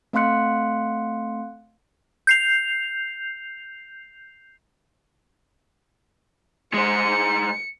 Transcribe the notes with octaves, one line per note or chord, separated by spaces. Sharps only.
A3 C4 F5 C6 F#6 C#7
G6 C7 F7
G#3 C5 C#7